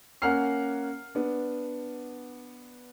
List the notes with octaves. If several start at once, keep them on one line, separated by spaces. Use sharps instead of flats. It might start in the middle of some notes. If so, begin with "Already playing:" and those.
A#3 C#4 F#5 A#5 F6 C7
B3 D4